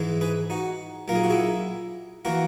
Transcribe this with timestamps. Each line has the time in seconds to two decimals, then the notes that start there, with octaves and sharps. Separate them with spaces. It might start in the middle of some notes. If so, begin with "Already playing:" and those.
Already playing: G#2 E3 G#3
0.21 G#4 B4
0.50 D#4 F#4
1.08 B1 A#2 A#3 A#4
1.15 G#4
1.24 F#4
1.30 E4 G#4
2.25 E3 A#3 F#4 A#4